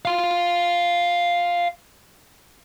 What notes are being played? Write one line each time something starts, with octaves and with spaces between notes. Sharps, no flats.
F5 C6